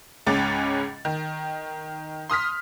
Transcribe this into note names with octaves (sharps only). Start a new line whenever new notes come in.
C#2 G#2 C#4 D6 A6
D#3
C6 D#6 F6 B6